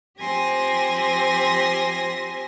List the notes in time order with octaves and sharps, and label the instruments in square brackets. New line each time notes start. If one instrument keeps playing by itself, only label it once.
[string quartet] F3 C4 G4 G#5 C6 A#6